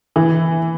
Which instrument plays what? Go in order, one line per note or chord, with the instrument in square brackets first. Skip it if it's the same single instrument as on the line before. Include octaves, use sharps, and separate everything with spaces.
[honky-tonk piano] E3